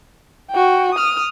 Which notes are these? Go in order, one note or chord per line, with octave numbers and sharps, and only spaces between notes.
F#4 G5
D#6 F6